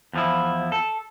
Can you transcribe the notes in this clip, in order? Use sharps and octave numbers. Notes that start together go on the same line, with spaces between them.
E2 F3 E4
A4